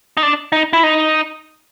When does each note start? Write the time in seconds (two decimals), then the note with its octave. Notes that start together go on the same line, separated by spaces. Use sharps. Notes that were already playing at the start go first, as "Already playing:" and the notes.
0.17 D#4
0.23 D4
0.52 D#4
0.73 E4
0.83 D#4